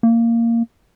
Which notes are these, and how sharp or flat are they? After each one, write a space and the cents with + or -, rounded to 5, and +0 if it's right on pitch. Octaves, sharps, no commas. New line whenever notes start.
A#3 -10